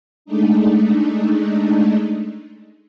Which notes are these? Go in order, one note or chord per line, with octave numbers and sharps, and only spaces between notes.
G#3 A3 D4 D#4